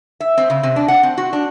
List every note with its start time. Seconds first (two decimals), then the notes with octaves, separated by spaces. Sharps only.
0.20 E5
0.37 C4
0.50 C#3
0.63 C3
0.76 D4
0.88 F#5
1.03 C4
1.18 F#4
1.33 D4